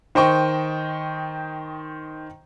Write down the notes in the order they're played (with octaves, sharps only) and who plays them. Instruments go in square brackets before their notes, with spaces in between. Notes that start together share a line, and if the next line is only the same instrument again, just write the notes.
[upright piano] D#3 C5 D#5 G5 C#6